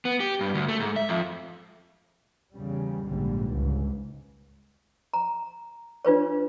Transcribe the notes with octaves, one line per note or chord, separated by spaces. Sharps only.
B3
G4
G2
D2
A3
G#2
E5
F2
E2 C#3 G3
A#1 G#2 D3 G3
C#2 G#2
A#5
D4 F4 B4 C#5